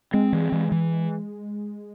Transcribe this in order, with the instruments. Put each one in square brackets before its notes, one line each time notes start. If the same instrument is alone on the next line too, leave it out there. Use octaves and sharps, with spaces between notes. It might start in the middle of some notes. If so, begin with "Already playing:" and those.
[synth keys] G#3 [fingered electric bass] C4
[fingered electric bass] E3
E3
E3